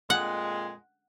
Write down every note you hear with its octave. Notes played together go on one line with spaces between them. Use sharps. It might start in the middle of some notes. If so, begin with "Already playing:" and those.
F2 A#2 G#3 F#5